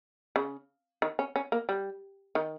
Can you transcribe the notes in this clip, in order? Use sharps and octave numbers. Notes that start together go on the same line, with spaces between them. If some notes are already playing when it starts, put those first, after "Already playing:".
C#3
D#3
C#4
C#4
A#3
G3
D#3